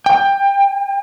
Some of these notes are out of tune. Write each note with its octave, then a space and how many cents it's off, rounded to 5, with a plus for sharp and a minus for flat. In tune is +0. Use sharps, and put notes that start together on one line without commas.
G5 +20